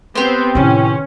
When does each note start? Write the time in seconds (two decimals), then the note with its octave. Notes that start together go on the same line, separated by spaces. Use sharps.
0.15 B3 C4 G4 C5
0.55 A2 C3 D#3 C#4